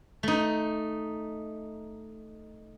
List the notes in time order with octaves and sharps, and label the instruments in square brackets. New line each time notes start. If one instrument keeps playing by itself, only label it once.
[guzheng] A3 D#4